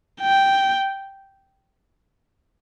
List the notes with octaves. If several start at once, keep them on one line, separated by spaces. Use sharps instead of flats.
G5